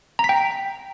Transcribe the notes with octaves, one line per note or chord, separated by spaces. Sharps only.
A#5
B6
G5